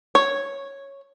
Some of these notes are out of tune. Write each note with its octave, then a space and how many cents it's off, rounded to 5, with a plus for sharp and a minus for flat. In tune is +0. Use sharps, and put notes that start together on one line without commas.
C#5 -5